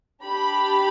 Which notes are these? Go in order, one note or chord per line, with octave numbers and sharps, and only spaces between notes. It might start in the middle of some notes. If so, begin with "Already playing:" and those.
D4 G4 B5